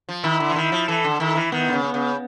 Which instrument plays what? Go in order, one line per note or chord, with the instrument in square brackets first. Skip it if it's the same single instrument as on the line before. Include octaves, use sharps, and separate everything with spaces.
[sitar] F3
[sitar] D#3 [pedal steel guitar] E4
[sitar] D3
E3
[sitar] D#3 [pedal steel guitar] E4
[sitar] F3
[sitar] E3 [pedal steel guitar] A4
[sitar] D3
[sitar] D#3 [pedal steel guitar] E4
[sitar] E3
[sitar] D#3 [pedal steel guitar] B3
[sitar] D3
C#3
[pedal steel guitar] B3
[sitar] C#3